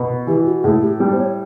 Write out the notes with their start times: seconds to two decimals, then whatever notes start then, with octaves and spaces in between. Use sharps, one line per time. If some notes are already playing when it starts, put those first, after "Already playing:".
Already playing: B2
0.27 E3 G4
0.46 F#4
0.63 A2 G#4
0.82 G4
1.00 G3
1.12 C5
1.19 C#5